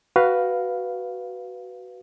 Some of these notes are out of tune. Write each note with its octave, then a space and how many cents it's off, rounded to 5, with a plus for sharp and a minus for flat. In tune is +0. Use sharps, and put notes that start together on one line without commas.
F#4 +15 B4 +0 F5 +0